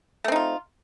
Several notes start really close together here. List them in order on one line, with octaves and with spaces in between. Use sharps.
A3 C4 D#4 F4